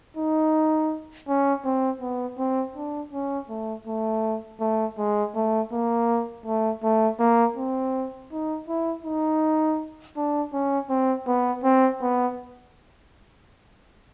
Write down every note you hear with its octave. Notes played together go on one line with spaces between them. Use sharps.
D#4
C#4
C4
B3
C4
D4
C#4
A3
A3
A3
G#3
A3
A#3
A3
A3
A#3
C4
D#4
E4
D#4
D4
C#4
C4
B3
C4
B3